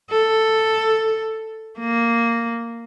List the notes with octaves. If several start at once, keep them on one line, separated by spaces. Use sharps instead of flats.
A4
A#3